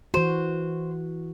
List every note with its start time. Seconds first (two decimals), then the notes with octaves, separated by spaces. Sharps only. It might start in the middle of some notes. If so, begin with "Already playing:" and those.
0.14 E3 F#4 C5